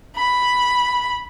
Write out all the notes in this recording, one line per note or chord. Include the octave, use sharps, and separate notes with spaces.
B5